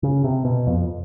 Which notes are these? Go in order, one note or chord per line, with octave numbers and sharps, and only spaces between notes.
C#3
C3
B2
F2